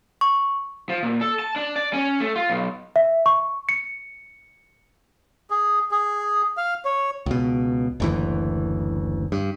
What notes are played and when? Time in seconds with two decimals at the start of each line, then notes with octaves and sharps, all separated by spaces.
0.21 C#6
0.89 F3
1.03 A#2
1.21 A4
1.39 A5
1.56 D4
1.76 D5
1.94 C#4
2.20 A3
2.36 F4
2.50 B1
2.96 E5
3.26 C#6
3.69 C#7
5.50 G#4
5.91 G#4
6.57 F5
6.85 C#5
7.26 C#2 B2
8.00 F#1 D2 E3
9.32 G2